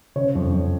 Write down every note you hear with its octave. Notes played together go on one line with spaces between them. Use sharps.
C#3 C#5
F2
F2